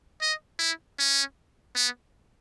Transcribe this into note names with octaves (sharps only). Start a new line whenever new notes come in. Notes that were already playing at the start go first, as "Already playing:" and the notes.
D#5
E4
C#4
B3